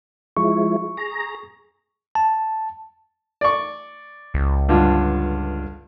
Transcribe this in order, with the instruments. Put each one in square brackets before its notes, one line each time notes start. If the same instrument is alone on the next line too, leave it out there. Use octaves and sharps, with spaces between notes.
[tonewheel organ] F3 G#3 E4 [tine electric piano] C#6
[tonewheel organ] G#4 A#5
[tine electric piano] A5
[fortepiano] D5 C#6
[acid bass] C#2
[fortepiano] G2 D3 F4